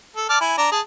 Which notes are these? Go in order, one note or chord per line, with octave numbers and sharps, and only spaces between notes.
A4
D5 A5 F6
E4 G#5
D4 A#5
G#4 A5